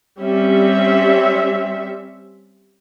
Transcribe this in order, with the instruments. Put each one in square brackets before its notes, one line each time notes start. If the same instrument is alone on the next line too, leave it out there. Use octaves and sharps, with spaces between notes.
[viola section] G3 C4 C#4 E5